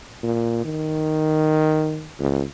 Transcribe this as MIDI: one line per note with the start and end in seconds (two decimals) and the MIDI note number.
0.23 0.64 46
0.65 2.09 51
2.19 2.43 37